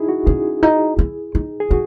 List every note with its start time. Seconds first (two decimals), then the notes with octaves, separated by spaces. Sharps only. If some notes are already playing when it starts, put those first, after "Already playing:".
Already playing: D#4 E4 G#4
0.09 F#4
0.26 C#4 G#4
0.63 D#4
0.99 E4
1.35 D#4
1.60 G#4
1.70 D#4 F#4